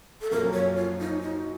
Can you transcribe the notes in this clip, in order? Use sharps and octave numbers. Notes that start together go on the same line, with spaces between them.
A4
F#2 F3 A#3 A#4
C#5
F4
D#4
D#4